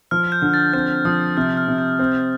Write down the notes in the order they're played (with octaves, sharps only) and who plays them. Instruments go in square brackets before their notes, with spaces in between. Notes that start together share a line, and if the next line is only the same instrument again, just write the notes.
[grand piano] F3 [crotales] F6
[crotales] G6
[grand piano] D3
[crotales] A6
[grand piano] C4 [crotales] G6
[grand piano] F3 [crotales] D#6
[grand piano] C3 [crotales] F6
[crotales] F6
[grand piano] C3
[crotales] G6
[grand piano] C4